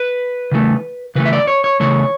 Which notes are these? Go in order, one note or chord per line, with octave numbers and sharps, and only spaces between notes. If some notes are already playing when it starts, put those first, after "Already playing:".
Already playing: B4
C#3 E3 A3
C#3 E3 A3 B4
E5
D5
C#5
C#5
C#3 E3 A3 C#5